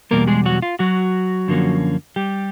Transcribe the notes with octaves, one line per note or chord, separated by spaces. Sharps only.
E2 B2 G3 A#3 A#4
G#3 G#4
F#3 F#4
F4
F#3 F#4
F#2 D3 F3 A#3 C#4
G3 G4